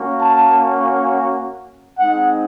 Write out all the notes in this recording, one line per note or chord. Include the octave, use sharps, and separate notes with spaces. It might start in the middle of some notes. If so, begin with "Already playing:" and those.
Already playing: A#3 C#4 F#4
A5
G#3 C4 D#4 F#5